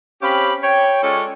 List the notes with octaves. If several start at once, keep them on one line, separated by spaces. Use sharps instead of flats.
C4 C#4 G4 F5 B5
C#5 G5
G#3 C#4 F4 A4 C#5 D5